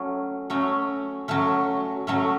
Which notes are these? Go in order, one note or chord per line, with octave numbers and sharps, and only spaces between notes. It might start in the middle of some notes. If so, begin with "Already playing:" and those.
Already playing: F#3 A3 C#4
F#3 A3 C#4
F#3 A3 C#4
F#3 A3 C#4